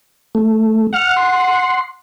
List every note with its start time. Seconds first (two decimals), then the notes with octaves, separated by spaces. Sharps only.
0.35 A3
0.94 F#5 F6
1.17 C6